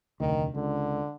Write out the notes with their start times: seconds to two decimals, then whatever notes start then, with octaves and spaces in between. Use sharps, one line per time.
0.20 F1 D2 D#3
0.55 C#2 D3